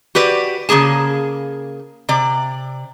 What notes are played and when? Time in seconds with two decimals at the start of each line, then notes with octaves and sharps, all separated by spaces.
0.15 F#4 G4 B4 D5
0.69 C#3 F3 A#3 G#4 A5
2.09 C3 D5